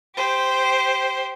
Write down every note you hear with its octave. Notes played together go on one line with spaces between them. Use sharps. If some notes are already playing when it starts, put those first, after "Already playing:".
G4 C5